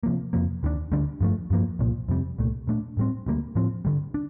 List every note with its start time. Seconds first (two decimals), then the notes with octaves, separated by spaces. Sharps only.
0.03 C3 F3 A#3
0.33 F2 C3 F3 A#3
0.63 D#2 D#3 A3 D4
0.92 D2 D3 G3 D4
1.21 G2 F3 A3
1.50 G2 F3 A#3
1.79 C2 A#2 F3
2.08 F2 C3 G3
2.38 C2 A#2 A3
2.67 A#2 A3 D4
2.97 A2 G3 C4
3.26 D2 D3 G3 A#3
3.55 A2 F3 C4
3.85 G2 D3 G3
4.14 D4